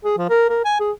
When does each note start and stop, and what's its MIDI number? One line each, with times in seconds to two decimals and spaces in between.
0.04 0.15 68
0.18 0.29 53
0.29 0.46 70
0.49 0.61 70
0.65 0.75 80
0.80 0.91 68